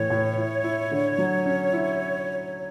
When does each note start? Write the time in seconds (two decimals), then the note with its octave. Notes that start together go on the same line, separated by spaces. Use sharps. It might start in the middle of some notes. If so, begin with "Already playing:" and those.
Already playing: A2 E3 C#5
0.10 A2
0.37 E4
0.64 E4
0.91 D3
1.18 F#3
1.46 C#4
1.73 E4